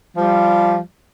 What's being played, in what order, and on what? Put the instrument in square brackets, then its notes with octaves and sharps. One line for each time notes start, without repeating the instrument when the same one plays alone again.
[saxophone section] F3 G3